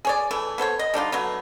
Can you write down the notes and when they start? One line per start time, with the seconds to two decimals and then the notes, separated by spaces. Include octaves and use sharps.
0.05 G#4 C#5 D5
0.31 E3 A3
0.58 B3 A4 C5 C#5
0.79 D#5
0.94 G3 D4 D#4 F4
1.12 F#3 A3 B3